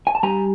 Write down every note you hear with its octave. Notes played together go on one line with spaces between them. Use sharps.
G#5
A5
G3 G#5 A#5